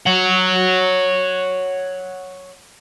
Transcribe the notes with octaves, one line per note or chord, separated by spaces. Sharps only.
C#5 F#5